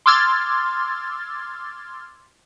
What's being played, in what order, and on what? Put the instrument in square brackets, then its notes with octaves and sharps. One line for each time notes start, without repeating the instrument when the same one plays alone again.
[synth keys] C6 D6 E6 F6 G#6 A6